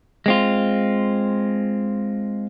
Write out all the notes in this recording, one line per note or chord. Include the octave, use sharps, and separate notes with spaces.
G#3 C4 F4